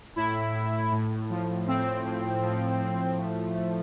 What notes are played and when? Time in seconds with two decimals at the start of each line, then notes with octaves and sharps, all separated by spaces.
0.16 A2 E4
0.53 A2
0.92 A2
1.30 F3
1.67 A2 C4
2.04 A2
2.42 F3
2.79 A2
3.17 A3
3.55 A3